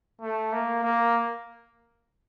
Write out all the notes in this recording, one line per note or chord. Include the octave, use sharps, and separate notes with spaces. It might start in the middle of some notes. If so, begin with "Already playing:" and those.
A3
A#3
A#3